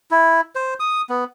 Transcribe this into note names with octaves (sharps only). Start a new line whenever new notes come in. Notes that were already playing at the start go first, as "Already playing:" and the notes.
E4
C5
D#6
B3